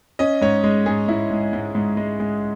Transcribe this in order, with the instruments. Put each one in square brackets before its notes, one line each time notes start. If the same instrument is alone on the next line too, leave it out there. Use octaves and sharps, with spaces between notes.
[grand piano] C#4 D#5
G#2 C#5
G#3
G#2 G#4
G#2 E4
G#2
G#2
G#2
G#3
G#3